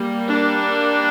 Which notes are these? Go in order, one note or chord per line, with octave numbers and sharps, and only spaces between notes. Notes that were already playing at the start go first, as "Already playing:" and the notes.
Already playing: G3 A#3
D4